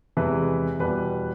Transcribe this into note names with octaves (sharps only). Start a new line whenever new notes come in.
E2 C3 E3 G#3 B4
E2 B2 G3 B4